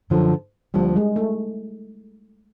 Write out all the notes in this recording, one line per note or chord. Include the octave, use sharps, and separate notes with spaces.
F#2 D3 F3
D2 D3 F3 G3 A#3 D4
G#3
A3